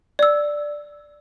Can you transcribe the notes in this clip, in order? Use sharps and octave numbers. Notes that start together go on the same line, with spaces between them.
D5 E6